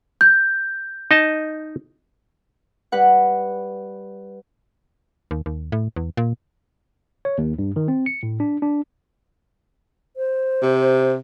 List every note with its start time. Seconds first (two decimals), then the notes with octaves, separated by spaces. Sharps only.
0.21 G6
1.11 D#4 D#5 A5
2.92 G3 B4 F#5
5.31 D#2
5.46 D#2
5.72 A2
5.96 E2
6.17 A#2
7.25 C#5
7.38 D#2
7.59 G2
7.76 D#3
7.88 C4
8.06 C#7
8.23 A2
8.40 D4
8.62 D4
10.17 C5
10.62 C3